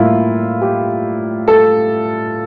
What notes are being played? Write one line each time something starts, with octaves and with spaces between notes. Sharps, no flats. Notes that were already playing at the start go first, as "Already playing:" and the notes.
Already playing: A2 G3 A#3 E4 F4
G4
A4